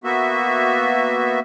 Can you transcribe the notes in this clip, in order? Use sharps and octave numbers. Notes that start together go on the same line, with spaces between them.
A#3 B3 F#4 E5